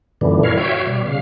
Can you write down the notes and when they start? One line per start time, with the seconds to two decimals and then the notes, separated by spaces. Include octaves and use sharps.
0.21 F#2 A#2 D3 E3 G3
0.43 E4 A#4 C#5 F5
0.57 F#4 C#5 E5 F5 G5
0.87 B2 G3
1.06 C#3 F5